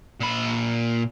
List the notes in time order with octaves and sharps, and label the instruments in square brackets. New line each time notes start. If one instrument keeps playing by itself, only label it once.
[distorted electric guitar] A#2 B5